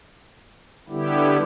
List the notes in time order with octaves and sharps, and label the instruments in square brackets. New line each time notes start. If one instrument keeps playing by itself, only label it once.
[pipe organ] D3 G3 B3 E4 G4